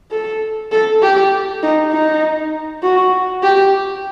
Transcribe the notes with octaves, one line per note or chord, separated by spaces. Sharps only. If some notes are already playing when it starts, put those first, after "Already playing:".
A4
A4
G4
D#4
D#4
F#4
G4